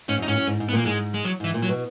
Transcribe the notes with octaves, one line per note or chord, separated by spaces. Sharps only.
G#2 C#4
F#2
D#4
G#2 C#4
F#2
G#2
G#2
B3
A#2 A#3
G#2 G#3
G#3
F#3
G#2 E3
A#2
F#3
B2